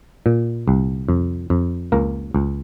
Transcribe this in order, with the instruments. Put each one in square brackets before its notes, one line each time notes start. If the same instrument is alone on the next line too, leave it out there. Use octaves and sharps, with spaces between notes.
[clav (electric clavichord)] A#2
C2
F2
F2
C#2 A#3 A#4
C#2